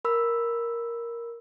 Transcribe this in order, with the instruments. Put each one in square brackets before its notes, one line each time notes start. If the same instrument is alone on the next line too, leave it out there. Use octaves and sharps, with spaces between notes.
[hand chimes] A#4 B5 E6